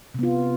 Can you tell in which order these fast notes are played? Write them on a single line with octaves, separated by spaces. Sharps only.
C3 B3 F4